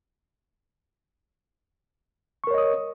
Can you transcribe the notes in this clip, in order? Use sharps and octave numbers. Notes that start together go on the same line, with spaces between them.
A#4 C#5 D#5 C#6 D#6